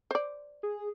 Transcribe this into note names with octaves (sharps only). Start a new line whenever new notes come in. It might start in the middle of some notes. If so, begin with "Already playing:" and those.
C5 D5
G#4